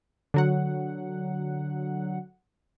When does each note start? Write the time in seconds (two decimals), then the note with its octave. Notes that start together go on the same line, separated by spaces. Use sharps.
0.34 D3 F#3 F#5